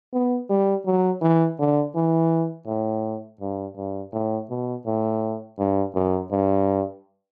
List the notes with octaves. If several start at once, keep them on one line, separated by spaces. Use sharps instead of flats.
B3
G3
F#3
E3
D3
E3
A2
G2
G2
A2
B2
A2
G2
F#2
G2